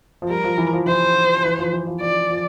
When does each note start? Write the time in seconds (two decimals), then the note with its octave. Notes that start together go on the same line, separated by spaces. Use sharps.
0.22 F3
0.29 G3 A#4
0.44 F3
0.58 E3
0.73 F3
0.87 E3 C5
1.45 E3
1.59 F3
1.73 E3
1.87 F3
2.01 F3 D5
2.30 F3